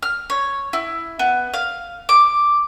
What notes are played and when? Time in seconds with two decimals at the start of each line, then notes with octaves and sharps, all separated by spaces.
0.02 F6
0.30 C#5
0.73 E4
1.19 B3
1.54 F5
2.09 D6